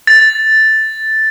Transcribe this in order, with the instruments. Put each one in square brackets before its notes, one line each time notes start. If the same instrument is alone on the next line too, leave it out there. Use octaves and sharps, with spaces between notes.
[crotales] A6